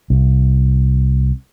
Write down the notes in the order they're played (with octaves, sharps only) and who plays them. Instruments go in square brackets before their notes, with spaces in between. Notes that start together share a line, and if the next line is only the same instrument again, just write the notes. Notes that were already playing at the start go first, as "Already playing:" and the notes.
[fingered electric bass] C2